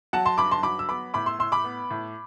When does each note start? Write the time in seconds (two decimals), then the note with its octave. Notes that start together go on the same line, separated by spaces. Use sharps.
0.13 F#3 F#5 A5
0.26 A5 C6
0.38 G2 B5 D6
0.51 A5 C6
0.63 F#3 B5 D6
0.79 E6
0.89 B3 B5 D6
1.14 A2 B5 D6
1.26 C6 E6
1.39 A2 C6 E6
1.52 B5 D6
1.64 B3
1.90 A2